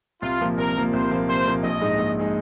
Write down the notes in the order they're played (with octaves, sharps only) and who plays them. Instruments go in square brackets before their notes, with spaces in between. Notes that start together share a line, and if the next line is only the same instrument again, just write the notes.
[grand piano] C2 [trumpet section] F4
[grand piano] A#2 F3 A#3
[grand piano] C2 [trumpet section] A#4
[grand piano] A#2 F3 A#3
[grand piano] C2 [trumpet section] C5
[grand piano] A#2 F3 A#3
[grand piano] C2 [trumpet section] C5
[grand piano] A#2 F3 A#3
[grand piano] A#1 [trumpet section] D#5
[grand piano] G#2 G#3 D#4
A#1
G#3 D#4